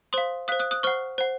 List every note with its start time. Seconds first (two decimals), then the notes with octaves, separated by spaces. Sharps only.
0.13 C5 F5 C6 D#6
0.48 C5 F5 D#6 F#6
0.59 D#6 F#6
0.71 D#6 F#6
0.83 C5 F#5 C#6 F6
1.18 C5 F#5